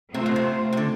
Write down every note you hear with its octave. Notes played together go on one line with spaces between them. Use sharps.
C3 A3 C4 F4 C5
B2
C3
C3
D3